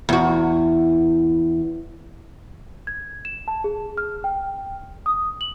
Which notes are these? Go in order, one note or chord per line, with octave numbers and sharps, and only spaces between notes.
E2 F#4
G#6
E7
A5
G#4
F6
G5
D#6
F#7